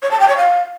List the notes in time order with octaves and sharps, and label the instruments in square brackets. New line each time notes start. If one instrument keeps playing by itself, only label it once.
[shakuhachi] C#5
A5
G5
C#5
F5